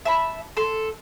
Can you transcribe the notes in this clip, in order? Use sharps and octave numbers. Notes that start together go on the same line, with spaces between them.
E5 A5 B5
A4 C6